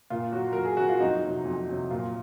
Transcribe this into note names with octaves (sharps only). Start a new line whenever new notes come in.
A#2 F4
F#3 F#4
A#2 A#4
G#4
F#3 F#4
F4
F2 D#4
C3 F#3
F2
C3 F#3
A#2 F4